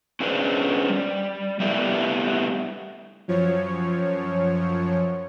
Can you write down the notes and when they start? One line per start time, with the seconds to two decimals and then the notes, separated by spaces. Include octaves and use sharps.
0.20 C#4 D4 G#4 B4 C5
0.89 G3
1.60 G3 A3 B3 E4 G4 D5
3.28 F#2 F3 C#5